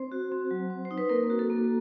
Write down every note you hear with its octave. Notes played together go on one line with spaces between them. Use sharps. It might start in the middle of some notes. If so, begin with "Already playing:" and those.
Already playing: C4 C5
F#4
C4
F#3
C4
C5
D#4
B4
A#3 A#4
F#4
A4
A#3